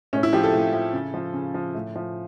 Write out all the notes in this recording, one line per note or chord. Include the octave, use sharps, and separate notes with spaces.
A2 C#4
E4
F3 G4
A4
A2
F3
C#3
F3
C#3
F3
A2
F3